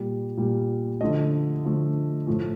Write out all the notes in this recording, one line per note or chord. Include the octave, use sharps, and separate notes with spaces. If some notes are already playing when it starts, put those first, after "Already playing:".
Already playing: A#2 G3
A#2 G3
D3 F3 A3 D#5
D3 F3 A3
A2 F3 A3